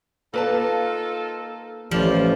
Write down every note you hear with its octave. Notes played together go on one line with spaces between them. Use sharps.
A#3 D#4 F4 A4 B4 A5
A1 F3 G3 D5